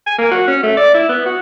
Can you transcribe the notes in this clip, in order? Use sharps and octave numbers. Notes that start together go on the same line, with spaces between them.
G#5
A#3
F#4
C#4
A3
D5
E4
B3
F#4